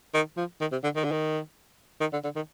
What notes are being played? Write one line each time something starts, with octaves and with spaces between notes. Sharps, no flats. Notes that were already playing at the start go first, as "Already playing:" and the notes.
D#3
F3
D#3
C3
D3
D#3
D3
D#3
D#3
D3
D3
D#3